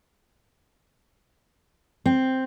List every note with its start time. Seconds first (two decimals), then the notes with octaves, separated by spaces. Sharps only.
2.06 C4